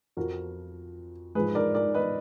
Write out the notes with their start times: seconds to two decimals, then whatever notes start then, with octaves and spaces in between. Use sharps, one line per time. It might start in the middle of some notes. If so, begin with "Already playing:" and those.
0.17 F2 F3 F#4 A#4
1.35 G#2 F3 G#4 B4
1.55 A#4 D5
1.75 A#4 D5
1.94 B4 D#5